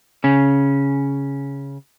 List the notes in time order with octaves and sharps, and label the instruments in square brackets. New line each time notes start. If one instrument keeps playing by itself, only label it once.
[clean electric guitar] C#3 C#4